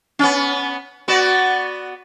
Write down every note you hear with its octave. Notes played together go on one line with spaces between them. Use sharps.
B3 C#4
B3 F#4 D5